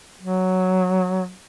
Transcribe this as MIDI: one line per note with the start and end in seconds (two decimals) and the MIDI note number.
0.20 1.31 54